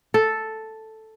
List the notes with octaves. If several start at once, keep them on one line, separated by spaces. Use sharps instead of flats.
A4